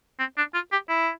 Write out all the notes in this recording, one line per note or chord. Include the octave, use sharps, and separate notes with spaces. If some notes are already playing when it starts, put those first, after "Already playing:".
C4
D4
F4
G4
E4